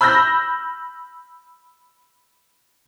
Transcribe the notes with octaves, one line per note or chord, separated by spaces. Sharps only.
B5 E6 F6 G6 A#6